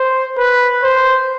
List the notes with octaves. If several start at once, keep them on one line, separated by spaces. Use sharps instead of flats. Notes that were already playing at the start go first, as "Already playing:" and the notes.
Already playing: C5
B4
C5